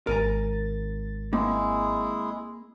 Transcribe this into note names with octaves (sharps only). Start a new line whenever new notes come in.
G#1 A#4 G#5 A#5 A6
G#3 A#3 C4 E4 G#4